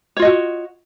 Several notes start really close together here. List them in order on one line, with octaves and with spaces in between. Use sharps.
C#5 F4 D#5 F#4